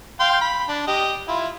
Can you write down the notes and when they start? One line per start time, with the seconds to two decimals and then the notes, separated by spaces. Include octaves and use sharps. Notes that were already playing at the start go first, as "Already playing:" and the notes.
0.20 F5 G5 C6
0.41 B5
0.69 D4
0.87 G4 D#5
1.28 E4 F4